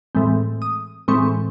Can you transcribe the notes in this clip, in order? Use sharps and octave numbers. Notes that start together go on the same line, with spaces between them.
A2 E3 G#3 C4
D#6
A2 E3 G#3 C4 C#6